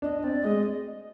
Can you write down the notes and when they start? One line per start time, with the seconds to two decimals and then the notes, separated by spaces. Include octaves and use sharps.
0.02 D4 D#5
0.24 C4 D5
0.44 G#3 D#5